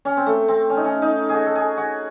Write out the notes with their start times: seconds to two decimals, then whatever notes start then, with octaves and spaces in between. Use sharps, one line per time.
0.05 C#4
0.17 C4
0.26 A3
0.48 C4
0.69 C#4
0.77 D#4
0.84 C#4
1.02 D#4
1.29 F#4 G#4
1.46 A4
1.55 G#4
1.77 F#4